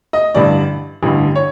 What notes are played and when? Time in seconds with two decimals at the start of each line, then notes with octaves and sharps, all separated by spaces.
0.13 D#5
0.35 A1 G2 D3 D5
1.03 A1 G2 D3
1.36 C#5